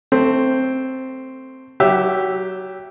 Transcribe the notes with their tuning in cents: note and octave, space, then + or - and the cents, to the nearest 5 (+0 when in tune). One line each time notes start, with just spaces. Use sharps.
A3 +15 C4 +0
F#3 +25 G4 +0 E5 +5